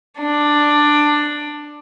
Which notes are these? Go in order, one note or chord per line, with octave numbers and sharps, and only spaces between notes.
D4